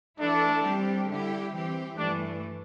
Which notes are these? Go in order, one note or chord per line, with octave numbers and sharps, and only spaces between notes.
E3 A3 D4 E4 A4 D5
G3 C4 G4
D3 G3 E4 G4
E3 C4 G4
G2 E3 A3 D4